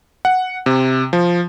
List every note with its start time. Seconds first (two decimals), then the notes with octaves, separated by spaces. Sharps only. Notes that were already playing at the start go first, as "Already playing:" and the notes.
0.25 F#5
0.66 C3
1.13 F3